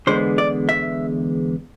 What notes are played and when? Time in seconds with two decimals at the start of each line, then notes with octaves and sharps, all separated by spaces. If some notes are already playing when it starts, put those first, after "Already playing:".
0.07 E2 D3 G#3 B3 C5
0.38 D5
0.69 E5